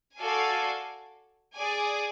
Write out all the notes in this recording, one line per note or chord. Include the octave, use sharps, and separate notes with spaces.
F#4 A4 D5 F5 G#5
G#4 D5 G#5